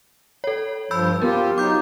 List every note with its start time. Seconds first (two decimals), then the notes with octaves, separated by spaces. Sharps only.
0.44 A4 C#5
0.91 G2 F3 B5 E6 G6
1.21 B3 F4 G4 A#4
1.58 F#3 D#4 D6 G6